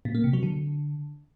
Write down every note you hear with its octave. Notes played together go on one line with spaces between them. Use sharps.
A#2
A#3
C3
F#3
D3